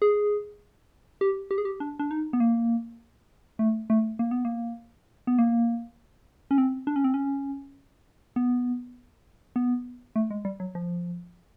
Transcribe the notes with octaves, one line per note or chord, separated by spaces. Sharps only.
G#4
G4
G4
G#4
G4
D4
D4
D#4
B3
A#3
A3
A3
A#3
B3
A#3
B3
A#3
C#4
C4
D4
C#4
C4
C#4
B3
B3
A3
G#3
G3
F#3
F3